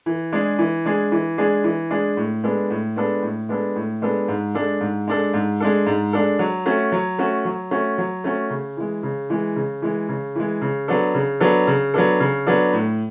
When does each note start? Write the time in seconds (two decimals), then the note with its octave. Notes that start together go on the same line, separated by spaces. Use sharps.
0.06 E3
0.32 G#3 D4 G#4
0.59 E3
0.86 G#3 D4 G#4
1.12 E3
1.38 G#3 D4 G#4
1.64 E3
1.91 G#3 D4 G#4
2.17 A2
2.44 G#3 B3 D4 A4
2.70 A2
2.96 G#3 B3 D4 A4
3.22 A2
3.49 G#3 B3 D4 A4
3.76 A2
4.02 G#3 B3 D4 A4
4.28 G#2
4.55 G#3 D4 A4
4.81 G#2
5.08 G#3 D4 A4
5.34 G#2
5.60 G#3 D4 A4
5.87 G#2
6.13 G#3 D4 A4
6.39 F#3
6.66 A3 C#4 F#4
6.92 F#3
7.18 A3 C#4 F#4
7.45 F#3
7.71 A3 C#4 F#4
7.98 F#3
8.24 A3 C#4 F#4
8.50 C#3
8.77 E3 G#3
9.03 C#3
9.30 E3 G#3
9.56 C#3
9.82 E3 G#3
10.09 C#3
10.35 E3 G#3
10.62 C#3
10.88 F#3 B3 D4 A4
11.15 C#3
11.40 F#3 B3 D4 A4
11.67 C#3
11.94 F#3 B3 D4 A4
12.20 C#3
12.47 F#3 B3 D4 A4
12.73 A2